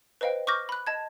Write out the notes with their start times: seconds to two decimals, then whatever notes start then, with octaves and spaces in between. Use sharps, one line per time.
0.21 B4 C5 D#5 F5 G5
0.47 C#6 D6 F6 G6 A#6
0.69 B5 F#6
0.87 D#5 A5 G#6